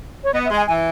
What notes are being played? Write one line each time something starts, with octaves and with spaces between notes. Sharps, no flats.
C#5
B3 D#5
E5
G#3
G#5
E3 G#5